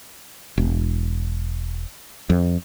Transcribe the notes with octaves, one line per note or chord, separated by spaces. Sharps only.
E1
F2